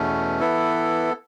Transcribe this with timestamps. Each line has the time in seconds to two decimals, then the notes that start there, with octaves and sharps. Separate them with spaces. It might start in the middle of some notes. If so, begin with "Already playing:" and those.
Already playing: E2 B2 A3 C#4
0.40 E3 B3 E4 A4